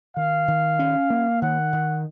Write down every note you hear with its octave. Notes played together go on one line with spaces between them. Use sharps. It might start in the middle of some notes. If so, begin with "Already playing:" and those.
D#3 F5
D#3
C#4
A#3
D#3 F#5
D#3